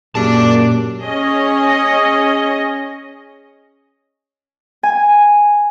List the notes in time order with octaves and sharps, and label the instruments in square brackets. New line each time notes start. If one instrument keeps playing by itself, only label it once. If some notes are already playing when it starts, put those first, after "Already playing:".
[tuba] F#2 [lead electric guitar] A#2 [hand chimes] A#3 G4 G#4 [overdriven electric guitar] D5 A5
[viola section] C#4 G#4 D#5
[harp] G#5